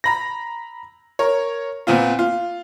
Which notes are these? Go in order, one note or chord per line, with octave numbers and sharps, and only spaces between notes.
A#5 B5 A#6
A#4 C#5
A#2 B3 C4 F4
F4